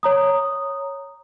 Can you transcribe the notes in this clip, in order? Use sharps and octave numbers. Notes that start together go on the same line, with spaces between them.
C#5 A#5 D#6